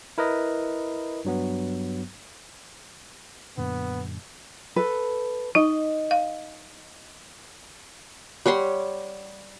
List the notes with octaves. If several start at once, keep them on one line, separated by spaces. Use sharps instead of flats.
E4 A#4 B4 D#5
G2 F#3 B3
F#2 A#2 D3 B3
A4 B4
D#4 D#5
F5
G3 C#5 F#5 C6